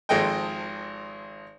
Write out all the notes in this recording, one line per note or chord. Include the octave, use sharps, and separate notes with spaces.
G#1 F3 G#3 A4 D#5 G5